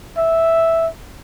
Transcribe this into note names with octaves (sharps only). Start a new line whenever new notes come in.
E5